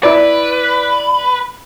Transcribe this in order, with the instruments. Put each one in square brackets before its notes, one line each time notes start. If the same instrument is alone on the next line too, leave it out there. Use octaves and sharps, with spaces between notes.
[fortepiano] E4 D5 [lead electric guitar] B4